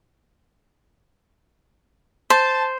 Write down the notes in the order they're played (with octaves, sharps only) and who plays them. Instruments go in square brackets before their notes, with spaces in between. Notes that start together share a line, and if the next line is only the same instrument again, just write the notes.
[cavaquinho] C5 [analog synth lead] A5